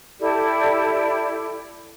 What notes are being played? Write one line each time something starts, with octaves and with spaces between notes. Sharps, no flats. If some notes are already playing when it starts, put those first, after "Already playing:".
E4 G4 A4 D5